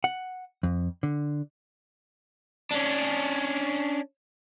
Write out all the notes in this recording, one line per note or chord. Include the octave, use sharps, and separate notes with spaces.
F#5
F2
D3
C#4 D4